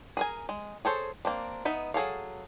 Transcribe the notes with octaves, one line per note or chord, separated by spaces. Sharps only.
G#4 A#4 G#5
G#3
G#4 A4 C5 C#5
A#3 C4 D4
B3 D#4 E5
F#3 G#4 A4 F5